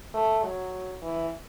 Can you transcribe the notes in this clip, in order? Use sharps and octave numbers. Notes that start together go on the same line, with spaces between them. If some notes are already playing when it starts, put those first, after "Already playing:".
A3
F#3
E3